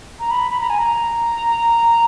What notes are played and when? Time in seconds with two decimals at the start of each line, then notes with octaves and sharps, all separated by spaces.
0.20 A#5
0.31 B5
0.51 B5
0.61 A#5
0.70 G#5
0.79 A#5